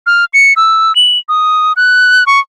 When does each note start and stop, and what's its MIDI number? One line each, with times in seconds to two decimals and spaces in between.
0.07 0.25 89
0.34 0.53 97
0.56 0.95 88
0.96 1.18 102
1.29 1.73 87
1.76 2.24 90
2.27 2.40 85